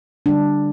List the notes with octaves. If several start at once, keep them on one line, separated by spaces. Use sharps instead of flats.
D3 G3 D4